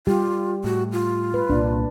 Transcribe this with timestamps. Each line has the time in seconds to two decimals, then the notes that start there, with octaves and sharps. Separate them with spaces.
0.07 G3 F4 G4
0.64 A2 F#4
0.92 F4
1.34 B4
1.50 C2 A#2 D4